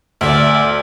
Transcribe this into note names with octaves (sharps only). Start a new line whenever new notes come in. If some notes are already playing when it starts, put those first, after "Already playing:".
D2 D5 E5